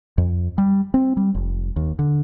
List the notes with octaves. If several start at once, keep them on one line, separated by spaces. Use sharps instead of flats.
F2
G3
C4
G3
F1
D#2
D3